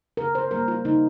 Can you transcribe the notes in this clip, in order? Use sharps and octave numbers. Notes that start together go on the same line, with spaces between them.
C#3 A#4
C5
G3 A#3 A#4
F4
C#3 D#4